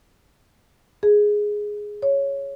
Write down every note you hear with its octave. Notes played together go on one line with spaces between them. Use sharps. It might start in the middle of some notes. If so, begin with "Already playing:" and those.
G#4
C#5